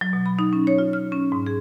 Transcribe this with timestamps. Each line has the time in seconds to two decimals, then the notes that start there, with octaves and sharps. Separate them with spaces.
0.01 F#3
0.13 B2
0.26 B5
0.39 D#4
0.53 C#4
0.67 C#5
0.78 F4
0.93 F6
1.12 C#4
1.32 G#2
1.46 G#4